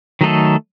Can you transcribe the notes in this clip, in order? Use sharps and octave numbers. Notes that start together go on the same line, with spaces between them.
D#3 F#3 A3 D#4 A4